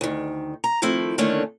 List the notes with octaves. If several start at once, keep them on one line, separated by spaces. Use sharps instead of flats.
D2 D#3
A#5
D#3 F3 A3 C4 E4
D3 D#3 A3 A#3 C#4 D4